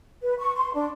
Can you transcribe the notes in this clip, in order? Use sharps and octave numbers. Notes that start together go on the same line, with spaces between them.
B4
C#6
C6
D4